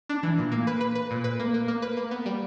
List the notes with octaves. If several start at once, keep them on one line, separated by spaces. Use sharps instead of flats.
D4
E3
A#2
A#3
B4
B4
B4
A#2
B4
A#3
A#3
A#3
B4
A#3
B3
G3